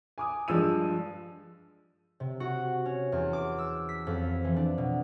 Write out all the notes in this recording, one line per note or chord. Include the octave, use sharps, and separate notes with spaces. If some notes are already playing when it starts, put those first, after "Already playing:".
G#5 D6 D#6
G2 F3 G#3 E6 D#7
C3
F#4
C#4
E2
D6
E6
B6
F2
E3
D4
B2